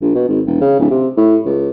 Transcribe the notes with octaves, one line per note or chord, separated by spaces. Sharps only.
A#1
B2
G#1
E1
C#3
D1
C3
A2
C#2